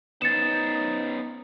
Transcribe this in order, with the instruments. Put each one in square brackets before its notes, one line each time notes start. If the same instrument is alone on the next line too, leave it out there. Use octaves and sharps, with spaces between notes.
[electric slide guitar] B3 C#4 C5 [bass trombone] D#4 [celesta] A6 C#7 E7